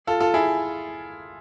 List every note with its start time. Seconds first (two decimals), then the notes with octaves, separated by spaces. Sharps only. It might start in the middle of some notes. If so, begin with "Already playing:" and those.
0.07 F4 A4
0.20 F4 A4
0.34 E4 G#4